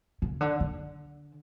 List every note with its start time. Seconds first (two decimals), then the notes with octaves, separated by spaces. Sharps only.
0.22 C#3
0.41 D3
0.60 D3